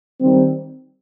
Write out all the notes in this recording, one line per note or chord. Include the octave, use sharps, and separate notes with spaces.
D#3 G3 C4